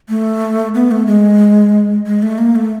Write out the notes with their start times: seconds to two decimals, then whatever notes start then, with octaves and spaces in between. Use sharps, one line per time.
0.09 A3
0.75 B3
0.91 A3
1.07 G#3
2.06 G#3
2.22 A3
2.38 A#3
2.56 A3